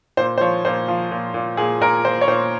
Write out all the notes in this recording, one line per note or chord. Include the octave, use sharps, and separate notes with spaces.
A#2 C5
C5
F3 C#5
A#2 C5
F3
A#2
A#2
A#2 G#4
A#2 A#4
A#2 C5
C#5
A#2 C5